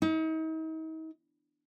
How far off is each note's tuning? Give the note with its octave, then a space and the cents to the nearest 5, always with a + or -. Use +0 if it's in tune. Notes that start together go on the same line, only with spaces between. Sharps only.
D#4 +40